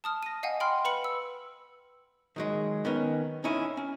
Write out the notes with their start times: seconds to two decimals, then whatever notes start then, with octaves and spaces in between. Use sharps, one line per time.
0.04 A5 D#6 F6
0.23 A#6 D#7
0.43 D#5 F5 F#5 G#5
0.60 G5 B5 C6 F6
0.85 B4 B5 C#7 F#7
1.04 E6
2.36 D#3 F#3 G#3
2.85 D#3 B3 C#4
3.44 C#4 D#4 E4 C#5 G#5
3.77 C#4